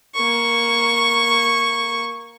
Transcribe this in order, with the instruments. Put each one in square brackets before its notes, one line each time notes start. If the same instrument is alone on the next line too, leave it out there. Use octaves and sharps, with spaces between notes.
[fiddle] A#3 C#6